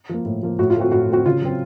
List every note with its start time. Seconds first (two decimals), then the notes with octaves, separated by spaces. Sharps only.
0.09 F3 A#3
0.25 A2
0.43 F3 A#3
0.59 A2 F#4
0.70 F4
0.76 A3 C4 F#4
0.92 A2 F#4
1.09 A3 C4 F#4
1.26 C#3 F4
1.42 F#3 C4